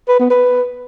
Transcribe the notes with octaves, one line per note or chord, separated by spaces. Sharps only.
B4
B3
B4